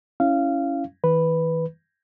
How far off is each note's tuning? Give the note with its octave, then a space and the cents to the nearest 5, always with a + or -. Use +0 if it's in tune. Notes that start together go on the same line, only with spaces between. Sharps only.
C#4 +0 E4 +0 F5 -15
E3 -45 B4 +0